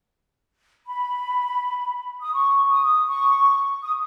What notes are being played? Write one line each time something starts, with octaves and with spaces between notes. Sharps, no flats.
B5
D#6
C#6
D#6
C#6
D#6